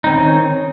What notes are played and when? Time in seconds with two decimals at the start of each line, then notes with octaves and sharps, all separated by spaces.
0.04 D#4
0.07 C4
0.09 D#3
0.12 C#4